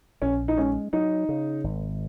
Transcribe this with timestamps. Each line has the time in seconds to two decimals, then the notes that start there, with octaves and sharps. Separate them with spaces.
0.22 A#1 C#4
0.48 D#4
0.58 G#3 C#4
0.93 F#3 D#4
1.29 C#3
1.64 G#1